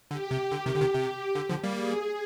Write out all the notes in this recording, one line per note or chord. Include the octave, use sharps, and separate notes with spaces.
D3 G4
C3
D3 G4
C3 D#3
D3
C3 D#3
C3 G4
D3
D3 F3
G3 A#3
G#4